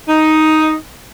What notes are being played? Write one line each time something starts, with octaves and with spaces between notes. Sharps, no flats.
D#4